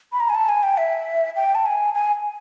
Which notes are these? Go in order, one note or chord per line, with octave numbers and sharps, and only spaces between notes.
B5
A#5
G#5
A5
G#5
G5
E5
G5
A5
G#5
G#5